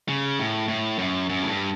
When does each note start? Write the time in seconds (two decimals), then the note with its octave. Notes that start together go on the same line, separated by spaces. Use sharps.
0.08 C#3
0.39 A2
0.68 A2
0.99 F#2
1.29 F#2
1.42 A2
1.49 G2